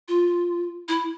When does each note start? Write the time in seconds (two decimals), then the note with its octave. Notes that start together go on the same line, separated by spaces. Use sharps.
0.08 F4
0.88 E4